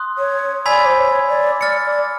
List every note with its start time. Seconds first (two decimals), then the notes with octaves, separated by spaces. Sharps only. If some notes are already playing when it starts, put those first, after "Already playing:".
Already playing: C6 D#6 F#6
0.18 C#5
0.66 D5 G#5 B5 E6 G#6 B6
0.86 C5
0.97 C#5
1.29 D5
1.61 D5 F6 A6 C#7
1.85 D5